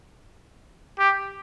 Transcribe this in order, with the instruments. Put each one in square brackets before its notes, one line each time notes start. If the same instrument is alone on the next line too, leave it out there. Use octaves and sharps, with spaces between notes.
[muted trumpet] G4